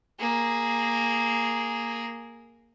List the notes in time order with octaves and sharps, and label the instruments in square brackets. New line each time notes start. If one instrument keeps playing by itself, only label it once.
[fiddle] A#3 G#4